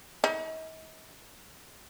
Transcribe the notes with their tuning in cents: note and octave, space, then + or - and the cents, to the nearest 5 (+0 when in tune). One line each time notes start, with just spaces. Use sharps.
D#4 +40